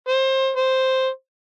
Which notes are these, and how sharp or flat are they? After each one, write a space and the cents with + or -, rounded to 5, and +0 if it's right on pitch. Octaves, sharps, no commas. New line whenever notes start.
C5 +25
C5 +0